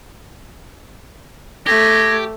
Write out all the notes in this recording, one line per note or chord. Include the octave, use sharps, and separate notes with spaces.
A3 G4 G#6 A#6